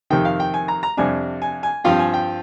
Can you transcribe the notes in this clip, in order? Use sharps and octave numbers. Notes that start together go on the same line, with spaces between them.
F2 C3 D#3 G5
F5
G5
G#5
A#5
A#5
F2 C3 G3 D4 G#5
G#5
G#5
G2 F3 C4 F4 G5
G#5
G5